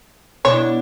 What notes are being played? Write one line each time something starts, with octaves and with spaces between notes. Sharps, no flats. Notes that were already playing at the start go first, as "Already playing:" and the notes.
B2 D4 E4 C#5